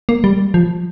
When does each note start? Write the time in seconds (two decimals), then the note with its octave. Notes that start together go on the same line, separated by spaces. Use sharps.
0.09 A#3
0.24 G3
0.54 F3